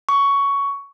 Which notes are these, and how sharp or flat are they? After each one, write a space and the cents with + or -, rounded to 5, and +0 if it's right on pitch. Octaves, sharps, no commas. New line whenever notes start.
C#6 +10